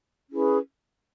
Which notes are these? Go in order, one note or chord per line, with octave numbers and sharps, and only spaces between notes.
C#4 E4 G#4 B4